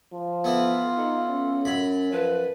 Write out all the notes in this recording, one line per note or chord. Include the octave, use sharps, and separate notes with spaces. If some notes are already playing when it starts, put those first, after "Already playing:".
F3
E3 B3 F4 A4
D#4 A4
C#4
F#2 B5
F3 B4